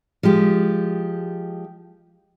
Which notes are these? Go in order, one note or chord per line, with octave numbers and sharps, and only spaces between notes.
F3 G#3 G4